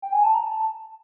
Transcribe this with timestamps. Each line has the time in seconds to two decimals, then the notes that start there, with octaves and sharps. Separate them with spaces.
0.02 G5
0.12 G#5
0.23 A5
0.34 A#5
0.50 A5